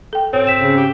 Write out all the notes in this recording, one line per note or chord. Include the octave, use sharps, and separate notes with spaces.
A4 G5
G#2 C4 C#5
B6 E7
C#3
G4